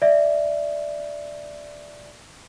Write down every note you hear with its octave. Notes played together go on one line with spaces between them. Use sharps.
D5 E5